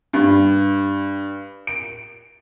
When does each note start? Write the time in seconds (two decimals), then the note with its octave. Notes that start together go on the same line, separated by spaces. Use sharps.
0.13 G2
1.67 D7